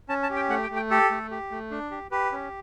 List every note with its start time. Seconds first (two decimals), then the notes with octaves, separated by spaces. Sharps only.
0.09 C#4 A5
0.23 A5
0.30 G4
0.36 G5
0.49 A3 F#5
0.63 G5
0.70 A3
0.76 G5
0.91 G4 A4
1.11 A3
1.31 G4
1.51 A3
1.71 D4
1.91 G4
2.11 G4 B4
2.32 C#4